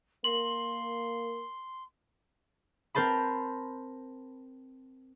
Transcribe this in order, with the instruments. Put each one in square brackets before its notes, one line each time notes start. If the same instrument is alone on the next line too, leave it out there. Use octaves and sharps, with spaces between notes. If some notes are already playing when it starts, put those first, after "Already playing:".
[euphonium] A#3 [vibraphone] A#4 [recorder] C6 [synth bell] F#7
[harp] C4 A#4 C5 A5 B5